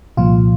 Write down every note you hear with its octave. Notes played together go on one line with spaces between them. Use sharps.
C2 A#2 F3 F4